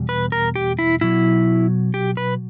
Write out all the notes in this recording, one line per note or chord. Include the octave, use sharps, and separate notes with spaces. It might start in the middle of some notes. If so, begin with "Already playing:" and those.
Already playing: E2 B2 G3
B4
A#4
G4
E4
B2 F#3 E4
G4
B4